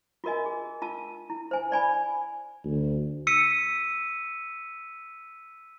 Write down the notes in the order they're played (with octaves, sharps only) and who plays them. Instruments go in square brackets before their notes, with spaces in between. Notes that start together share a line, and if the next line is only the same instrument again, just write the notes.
[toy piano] F4 F#4 A#4 D#5 G#5
G#4
F4 A5 E6
E4
C5 G#5
C5 D5 G#5 B5
[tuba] D2
[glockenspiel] E6 B6 C#7 D#7